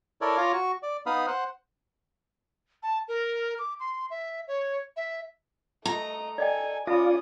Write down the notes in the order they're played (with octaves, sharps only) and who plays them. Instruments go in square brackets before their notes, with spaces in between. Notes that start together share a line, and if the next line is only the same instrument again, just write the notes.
[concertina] E4 A4 A#4 C#5 D5
F4 C#5 F5 A#5 D6
F#4 C#6
D5
B3 D#4 F5 B5 D#6
C5 F#5
[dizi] A5
A#4
D6
C6
E5
C#5
E5
[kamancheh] A3 D#5 [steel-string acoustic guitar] A#5
[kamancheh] A4 G#5 [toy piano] D5 D#5 G5
[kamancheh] C#4 D#6 [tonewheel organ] F4 D5 [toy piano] E5 B5